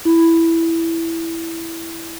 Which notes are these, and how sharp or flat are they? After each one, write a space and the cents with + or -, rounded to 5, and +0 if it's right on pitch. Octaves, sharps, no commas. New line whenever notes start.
E4 +5